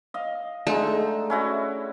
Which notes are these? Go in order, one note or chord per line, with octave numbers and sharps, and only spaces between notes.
D#5 F5
D3 G#3 A3 D#4
C#4 E4 F#4